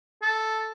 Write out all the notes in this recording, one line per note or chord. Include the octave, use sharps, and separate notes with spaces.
A4